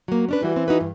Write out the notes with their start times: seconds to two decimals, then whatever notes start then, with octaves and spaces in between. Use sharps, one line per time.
0.08 F#3 A#3
0.29 C#4 D4 B4
0.43 E3 G3 F#4
0.56 C4
0.68 D#4 F#4 B4
0.81 G2